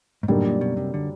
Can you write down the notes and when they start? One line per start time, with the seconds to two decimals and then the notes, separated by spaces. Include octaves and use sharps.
0.23 G#2
0.28 F#2 A2 D3 G3 A#3 D#4
0.45 A#2
0.61 B2
0.77 C3
0.94 D3